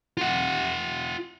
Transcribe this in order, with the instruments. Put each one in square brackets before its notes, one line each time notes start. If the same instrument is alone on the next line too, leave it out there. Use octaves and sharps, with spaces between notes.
[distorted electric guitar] F4 F#5